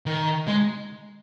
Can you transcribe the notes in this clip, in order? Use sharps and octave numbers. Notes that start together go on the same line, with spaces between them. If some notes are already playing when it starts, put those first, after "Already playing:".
D#3
G#3